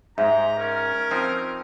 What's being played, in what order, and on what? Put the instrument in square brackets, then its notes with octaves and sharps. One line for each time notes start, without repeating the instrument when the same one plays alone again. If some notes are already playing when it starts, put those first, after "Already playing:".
[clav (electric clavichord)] G#2 G#3 [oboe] G4 [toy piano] E5 [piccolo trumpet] A#5
[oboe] C#4 [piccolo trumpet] A#4
[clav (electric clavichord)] F3 C4 D#4